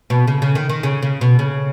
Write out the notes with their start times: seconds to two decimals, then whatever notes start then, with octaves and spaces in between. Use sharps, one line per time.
0.10 B2
0.27 C#3
0.42 C#3
0.55 D#3
0.69 D#3
0.83 C#3
1.03 C#3
1.21 B2
1.39 C#3